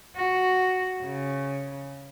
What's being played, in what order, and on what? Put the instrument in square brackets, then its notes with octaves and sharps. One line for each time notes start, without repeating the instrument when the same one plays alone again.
[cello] F#4
C#3